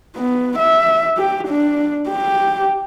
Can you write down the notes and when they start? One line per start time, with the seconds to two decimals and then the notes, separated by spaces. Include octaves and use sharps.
0.16 B3
0.58 E5
1.18 G4
1.48 D4
2.09 G4